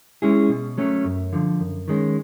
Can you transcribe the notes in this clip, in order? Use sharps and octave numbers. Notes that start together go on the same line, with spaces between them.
G#3 C#4 E4 G#4
B2
F#3 A3 C#4
F#2
D3 F3
F#2
D#3 G#3 C#4